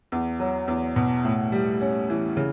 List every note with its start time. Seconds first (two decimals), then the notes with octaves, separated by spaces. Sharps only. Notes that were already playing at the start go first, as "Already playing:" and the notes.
0.12 E2
0.40 F#3
0.68 E2
0.96 B2
1.25 A2
1.52 G3
1.81 C#4
2.10 E3
2.37 C#3